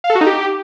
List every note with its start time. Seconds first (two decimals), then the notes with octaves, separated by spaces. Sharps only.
0.04 F5
0.10 A4
0.15 F#4
0.21 D#4
0.27 G4